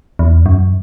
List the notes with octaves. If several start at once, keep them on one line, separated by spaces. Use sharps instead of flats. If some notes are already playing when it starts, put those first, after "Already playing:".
E2
F#2